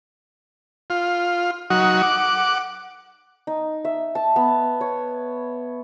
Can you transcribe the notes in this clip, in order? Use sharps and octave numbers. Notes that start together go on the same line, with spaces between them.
F4
F#3 D#4 F#4
F#5 D6
D#4
E5
A5
B3
C#5